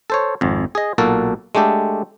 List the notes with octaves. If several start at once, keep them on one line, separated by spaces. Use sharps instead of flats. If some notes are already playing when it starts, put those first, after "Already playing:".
A4 C5 C#5
G#1 F2
G#4 D#5
B1 A#2 A#3 F#4 A4
G#3 A3 D4 G4 A4